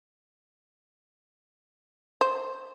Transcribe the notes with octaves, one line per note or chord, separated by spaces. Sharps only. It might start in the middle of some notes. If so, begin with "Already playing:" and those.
C5